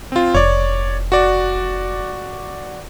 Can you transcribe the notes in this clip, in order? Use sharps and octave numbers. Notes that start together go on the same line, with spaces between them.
C4 F4
F1 C#5 D5
F#4 D5